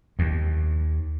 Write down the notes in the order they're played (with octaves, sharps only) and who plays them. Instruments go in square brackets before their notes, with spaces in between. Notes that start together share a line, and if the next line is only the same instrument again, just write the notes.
[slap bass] D#2